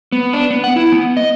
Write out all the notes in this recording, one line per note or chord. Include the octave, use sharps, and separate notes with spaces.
B3
D4
B3
F#5
E4
B3
D#5